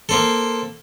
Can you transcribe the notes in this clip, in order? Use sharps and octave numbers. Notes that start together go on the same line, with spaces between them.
A#3 C4 A4